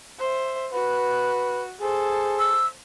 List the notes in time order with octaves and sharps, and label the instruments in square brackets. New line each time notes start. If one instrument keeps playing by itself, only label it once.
[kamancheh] C5 E5
[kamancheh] F#4 [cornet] B4
[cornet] G#4 [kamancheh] A4 C5
[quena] E6